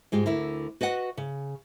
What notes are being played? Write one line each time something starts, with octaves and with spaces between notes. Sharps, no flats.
G#2 G#3 F4 G4
D2 D3 E4 A#4
F#4 B4 D#5 F#5
C#3